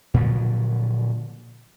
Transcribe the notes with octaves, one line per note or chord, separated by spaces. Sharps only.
A#2 D3 F3 F#3